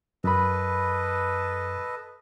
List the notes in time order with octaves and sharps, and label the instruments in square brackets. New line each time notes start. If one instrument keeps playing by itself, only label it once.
[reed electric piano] F#2 B5 [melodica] A4 B4 D#5